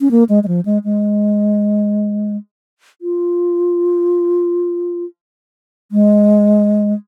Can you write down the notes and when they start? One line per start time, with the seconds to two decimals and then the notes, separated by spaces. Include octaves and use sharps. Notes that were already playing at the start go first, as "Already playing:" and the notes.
0.01 C#4
0.11 A#3
0.29 G#3
0.43 G#3
0.48 F3
0.65 G#3
0.84 G#3
3.02 F4
5.92 G#3